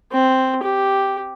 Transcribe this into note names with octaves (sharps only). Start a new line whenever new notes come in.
C4
G4